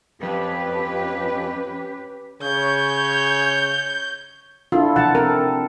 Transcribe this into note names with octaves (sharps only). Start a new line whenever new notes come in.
F2 C#4 G4 B4
C#3 C#5 G6
D4 E4 F4 A4
C3 F3 F#5 A5
C4 A4 A#4